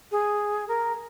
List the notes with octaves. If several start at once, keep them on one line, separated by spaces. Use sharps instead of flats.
G#4
A#4